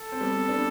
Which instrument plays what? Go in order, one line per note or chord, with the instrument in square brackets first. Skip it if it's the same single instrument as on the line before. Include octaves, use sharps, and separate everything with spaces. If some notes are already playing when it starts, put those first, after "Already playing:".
Already playing: [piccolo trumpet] A4
[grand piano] C4
G3 B3
B3 D4